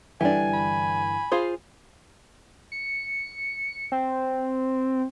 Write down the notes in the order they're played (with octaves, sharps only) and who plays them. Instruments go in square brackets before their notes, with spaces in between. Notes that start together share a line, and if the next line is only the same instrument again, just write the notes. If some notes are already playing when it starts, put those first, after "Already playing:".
[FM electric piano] G2 D3 E3 [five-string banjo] D4 G4 [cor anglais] G#5
[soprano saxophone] B5
[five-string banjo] F4 G#4 C5
[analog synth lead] C#7
C4